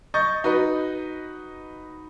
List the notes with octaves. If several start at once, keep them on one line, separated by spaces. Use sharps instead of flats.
D#5 C#6 G6 A6
D#4 F#4 B4 D#5